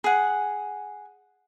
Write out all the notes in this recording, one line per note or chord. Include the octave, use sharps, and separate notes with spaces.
G#4 F#5